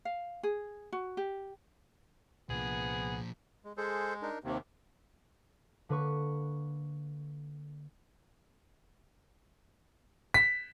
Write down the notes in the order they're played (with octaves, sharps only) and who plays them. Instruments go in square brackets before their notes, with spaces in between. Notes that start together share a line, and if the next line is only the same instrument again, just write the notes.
[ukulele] F5
G#4
F#4
G4
[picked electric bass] C2 [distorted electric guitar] A#2 F3 [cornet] B3 [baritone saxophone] G#4
[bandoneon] G#3
[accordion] G#3 [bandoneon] G#4 A4 C5
[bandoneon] D4 D#4 A#4
[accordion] D#2 C3 D#3 [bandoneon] A#3
[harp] D3 A#3 B4 B5 C#6
[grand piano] B6